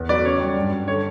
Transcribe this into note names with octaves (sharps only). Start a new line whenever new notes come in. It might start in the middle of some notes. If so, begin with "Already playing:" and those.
Already playing: E2 B3
F#3 B4 D5
C#3 C#5
G3
G2
G2
D3 C#5